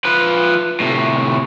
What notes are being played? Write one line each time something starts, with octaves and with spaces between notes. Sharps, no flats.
F3 B4
A2 C3